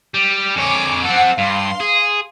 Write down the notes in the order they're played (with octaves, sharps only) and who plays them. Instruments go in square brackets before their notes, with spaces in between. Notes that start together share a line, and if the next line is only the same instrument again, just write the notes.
[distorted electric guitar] G3
[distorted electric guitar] F2 C#5 [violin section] G#5 D6
[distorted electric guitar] C4 A4 [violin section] F#5
[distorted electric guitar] G2 [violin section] F5 C6
[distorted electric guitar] G#4